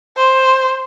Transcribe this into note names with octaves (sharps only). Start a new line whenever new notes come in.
C5